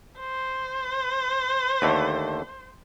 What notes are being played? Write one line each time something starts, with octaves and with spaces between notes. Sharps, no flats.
C5
D#2 D3 A3